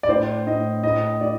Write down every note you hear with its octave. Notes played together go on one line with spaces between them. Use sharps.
D5
A2 C5
A2 D#5
A2 D#5
A2 D5